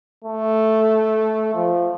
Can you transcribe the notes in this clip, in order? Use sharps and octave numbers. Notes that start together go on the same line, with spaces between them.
A3
F3